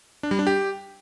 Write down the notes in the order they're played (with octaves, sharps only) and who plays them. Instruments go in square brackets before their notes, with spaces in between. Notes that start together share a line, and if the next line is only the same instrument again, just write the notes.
[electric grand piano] D4
G3
D4
G4